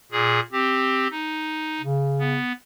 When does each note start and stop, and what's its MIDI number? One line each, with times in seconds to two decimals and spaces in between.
0.12 0.40 46
0.12 0.40 68
0.52 1.08 60
0.52 1.08 67
1.10 1.82 63
1.81 2.38 49
2.19 2.52 59